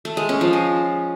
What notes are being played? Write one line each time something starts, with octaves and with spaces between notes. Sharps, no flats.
A3
G#3
C#4
F3
G#3